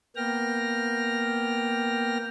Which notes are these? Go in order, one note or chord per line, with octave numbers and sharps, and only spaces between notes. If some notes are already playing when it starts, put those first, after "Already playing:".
A#3 B3 G5 F6 A#6